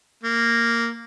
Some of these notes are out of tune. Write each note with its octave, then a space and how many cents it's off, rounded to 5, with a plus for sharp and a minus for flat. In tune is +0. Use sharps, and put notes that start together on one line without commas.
A#3 -5